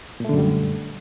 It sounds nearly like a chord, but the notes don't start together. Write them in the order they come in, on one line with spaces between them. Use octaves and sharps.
A#2 A3 D3 F#2 G3